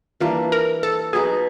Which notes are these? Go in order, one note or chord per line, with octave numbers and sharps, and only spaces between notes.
E3 G3 A#3 D4 F4
A#4
A4
B2 F#3 B3 D#4 G#4